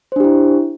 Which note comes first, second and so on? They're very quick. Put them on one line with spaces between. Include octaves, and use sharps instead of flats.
C5 D4 G4 E4